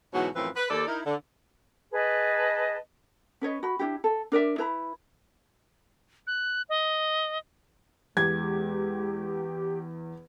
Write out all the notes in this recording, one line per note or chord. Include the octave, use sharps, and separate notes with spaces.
G#2 B2 E3 F#3 F#4
F#2 A2 E3 F3 C4 B4
B4
D#2 A4 D5
D#4 E4 A#4
D3
G#4 B4 D#5 A5
C#4 B4 C#5 D#5
F#4 B5
D4 E4 F#4 G4
A4
D4 A#4 D5 E5
E4 B4 A#5 B5
F#6
D#5
E2 G#3 G4 G#6